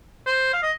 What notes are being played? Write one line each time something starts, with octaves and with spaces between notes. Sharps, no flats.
C5
F5
D#5